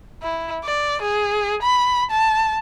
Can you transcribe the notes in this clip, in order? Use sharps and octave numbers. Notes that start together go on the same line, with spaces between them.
E4
D5
G#4
B5
A5